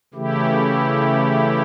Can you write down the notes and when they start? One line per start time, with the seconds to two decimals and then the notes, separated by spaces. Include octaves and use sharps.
0.14 C#3 E3 A3 E4 G4